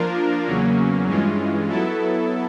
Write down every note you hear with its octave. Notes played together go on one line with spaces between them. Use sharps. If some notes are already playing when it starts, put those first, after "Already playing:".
Already playing: F3 A#3 D4 F4 A#4
E2 C#3 F#3 A#3 C#4
G2 E3 G#3 C#4 F4
F#3 B3 E4 A4